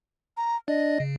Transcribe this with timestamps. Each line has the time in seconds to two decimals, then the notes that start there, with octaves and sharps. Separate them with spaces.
0.37 A#5
0.68 D4 D5 D#5
1.00 C#3